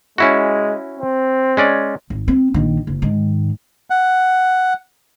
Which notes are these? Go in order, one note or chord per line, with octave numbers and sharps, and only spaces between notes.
G#3 C#4 E4 F#4
C4
G#3 C#4 D5
G#1
C4
A#1 D#3
F#1
G#2 D#3
F#5